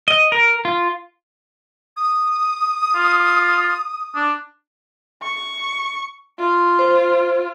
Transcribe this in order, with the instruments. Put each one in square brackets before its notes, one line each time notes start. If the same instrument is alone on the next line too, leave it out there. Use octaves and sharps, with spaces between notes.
[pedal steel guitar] D#5
A#4
F4
[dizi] D#6
[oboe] F4
D4
[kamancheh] C#6
F4
[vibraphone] C5